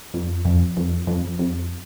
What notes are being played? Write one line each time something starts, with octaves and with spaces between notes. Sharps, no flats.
F2
F2
F2
F2
F2